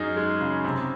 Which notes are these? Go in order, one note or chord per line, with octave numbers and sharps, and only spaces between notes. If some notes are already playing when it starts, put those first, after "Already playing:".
Already playing: F#2 D#4 G#4
G#3
C#3
C3